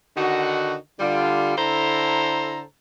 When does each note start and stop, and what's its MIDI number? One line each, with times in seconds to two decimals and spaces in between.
0.17 0.76 50
0.17 0.76 51
0.17 0.76 63
0.17 0.76 66
1.00 1.57 50
1.00 1.57 55
1.00 1.57 65
1.57 2.62 50
1.57 2.62 64
1.57 2.62 69
1.57 2.62 72
1.57 2.62 82